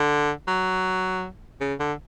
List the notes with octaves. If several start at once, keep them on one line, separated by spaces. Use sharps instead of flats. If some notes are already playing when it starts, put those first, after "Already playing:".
Already playing: D3
F#3
C#3
D3